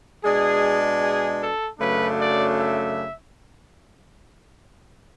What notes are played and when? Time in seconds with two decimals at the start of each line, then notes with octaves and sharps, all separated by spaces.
0.24 B2 G#3 D4 G#4
1.02 G#4
1.42 A4
1.80 F#2 C#3 F#3 A3 D4 B4
2.20 D5
2.59 E5